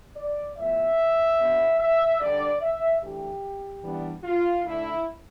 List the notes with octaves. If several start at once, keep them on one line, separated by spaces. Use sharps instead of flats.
D5
A2 F3 B3 E5
B2 B3 D4
E5
D3 G3 D4 D5
E5
E3 A3 D4 G4
E3 G3 B3 D4
F4
D3 A3 D4 E4